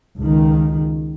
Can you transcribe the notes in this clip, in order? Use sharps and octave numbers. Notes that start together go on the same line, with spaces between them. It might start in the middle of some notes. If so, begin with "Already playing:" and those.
C#2 D#3